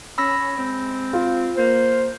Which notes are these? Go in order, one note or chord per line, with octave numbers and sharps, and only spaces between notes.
C#4 B5 E6 A#6
G#3 C4
F4
A#3 C5